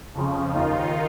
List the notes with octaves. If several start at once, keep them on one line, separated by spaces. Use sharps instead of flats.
F2 C#3 F3
D#2 D#3 D#4 F4